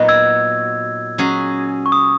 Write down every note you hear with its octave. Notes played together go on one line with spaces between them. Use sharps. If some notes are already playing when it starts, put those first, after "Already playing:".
Already playing: A#2 F#3 B3 D#4 F#4
E6 G#6
F#3 C#4 G#4
C#6
D#6